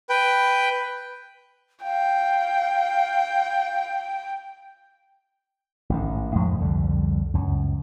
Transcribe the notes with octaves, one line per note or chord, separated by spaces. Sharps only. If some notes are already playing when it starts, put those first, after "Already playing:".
B4 G5
F5 G5
A1 G#2 D#3
F2 A2 F3 G#3
C2 F2 D3 G3
C#2 F#2